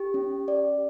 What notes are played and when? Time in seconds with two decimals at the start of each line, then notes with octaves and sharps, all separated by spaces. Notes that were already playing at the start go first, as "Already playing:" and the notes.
Already playing: G4
0.14 C#4
0.48 D5